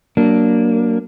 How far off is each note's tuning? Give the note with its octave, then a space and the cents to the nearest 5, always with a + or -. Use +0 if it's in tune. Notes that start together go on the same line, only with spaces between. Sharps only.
F#3 +15 A#3 +0 D4 +0